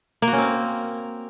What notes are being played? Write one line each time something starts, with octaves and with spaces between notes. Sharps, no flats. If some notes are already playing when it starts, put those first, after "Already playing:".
A#3
F#4
C#4
C4